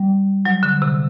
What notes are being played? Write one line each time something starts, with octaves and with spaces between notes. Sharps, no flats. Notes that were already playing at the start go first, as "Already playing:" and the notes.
Already playing: G3
F#3
D3
C3